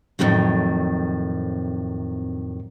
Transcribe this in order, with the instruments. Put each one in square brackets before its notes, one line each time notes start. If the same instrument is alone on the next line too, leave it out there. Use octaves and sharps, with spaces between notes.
[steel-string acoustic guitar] F2 A2 C3 D#3 F#3